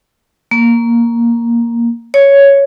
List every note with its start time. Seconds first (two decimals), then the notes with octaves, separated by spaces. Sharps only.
0.51 A#3
2.14 C#5